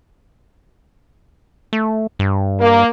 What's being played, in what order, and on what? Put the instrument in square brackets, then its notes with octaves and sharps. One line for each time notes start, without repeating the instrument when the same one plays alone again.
[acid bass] A3
G2
[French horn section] A#3